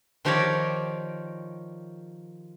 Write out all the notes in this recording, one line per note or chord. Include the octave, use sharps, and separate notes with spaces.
D#3 F3 G4 A#4 C#5 D5